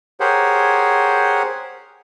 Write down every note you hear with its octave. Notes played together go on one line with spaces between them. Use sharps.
G4 G#4 A#4 C5 C#5 F#5